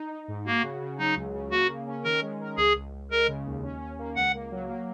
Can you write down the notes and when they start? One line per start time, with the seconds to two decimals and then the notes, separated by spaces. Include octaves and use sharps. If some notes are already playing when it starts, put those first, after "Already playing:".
Already playing: D#4
0.10 D#4
0.28 G#2
0.45 A#3 F#4
0.63 C#3
0.81 C#3
0.98 F#3 D#4
1.16 C#2
1.34 C#3
1.51 A#3 F#4
1.70 C#3
1.87 C#4
2.04 D#3 A#4
2.22 G#3
2.40 A#4
2.57 C#2 G#4
2.75 C#2
2.93 C#2
3.10 G#3 A#4
3.28 C#3
3.46 D#2
3.63 C#4
3.81 C#4
3.99 A#3
4.16 C#2 F#5
4.34 A#3
4.51 F#3
4.69 A#3